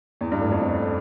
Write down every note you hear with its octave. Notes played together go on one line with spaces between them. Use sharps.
E2
G2
A2
F2